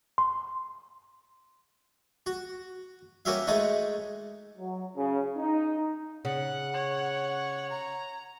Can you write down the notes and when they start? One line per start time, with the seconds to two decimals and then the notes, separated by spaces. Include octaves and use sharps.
0.18 C6
2.26 F#4
3.25 A#3 C#4 F#4 G4 E5 F5
3.47 G#3 A3 D#4 C#5 F#5
4.57 F#3
4.97 C#3
5.37 D#4
6.25 C#3 F#5
6.74 C#5
7.70 A#5